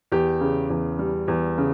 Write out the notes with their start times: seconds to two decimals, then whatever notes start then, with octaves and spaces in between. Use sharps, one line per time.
0.12 E2 G4
0.41 C#3
0.70 E2
0.99 G3
1.28 E2
1.58 C#3